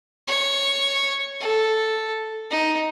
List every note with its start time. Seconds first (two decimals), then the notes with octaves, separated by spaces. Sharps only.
0.27 C#5
1.40 A4
2.51 D#4